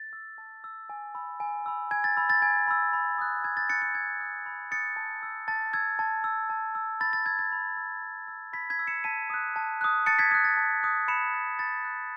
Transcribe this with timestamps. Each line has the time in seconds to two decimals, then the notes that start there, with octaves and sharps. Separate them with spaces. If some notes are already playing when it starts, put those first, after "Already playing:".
Already playing: A6
0.13 E6
0.38 A5
0.64 E6
0.89 G#5
1.15 B5 E6
1.40 G#5
1.66 B5 E6
1.91 G#5 G#6
2.04 A6
2.17 B5 E6
2.30 A6
2.42 G#5 G#6
2.68 B5 E6
2.93 B5
3.18 D#6 F#6
3.44 B5 G#6
3.57 A6
3.69 D#6 F#6 A6 C#7
3.82 A6
3.95 B5 G#6
4.20 D#6 F#6
4.46 B5
4.71 D#6 F#6 A6 C#7
4.96 A5
5.23 E6
5.48 A5 A6
5.74 E6 G#6
5.99 A5
6.24 E6
6.50 A5
6.75 E6
7.00 B5 A6
7.13 A6
7.26 E6 G#6
7.39 A6
7.52 B5
7.77 E6
8.03 B5
8.28 E6
8.53 B5 G#6 B6
8.70 G#6 B6
8.79 E6
8.87 C#7 E7
9.04 A5 B6 D#7
9.30 D#6 F#6
9.56 A5
9.81 D#6 F#6
10.06 A5 A6 C#7
10.19 G#6 B6
10.31 D#6 F#6 G#6
10.44 A6
10.57 A5
10.83 D#6 F#6
11.08 B5 C#7 E7
11.34 F#6 A6
11.59 B5 A6
11.85 F#6